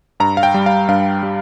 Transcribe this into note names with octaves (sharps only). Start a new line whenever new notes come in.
G2 A#5
F5
G5
G3
F5
G2 F5
G3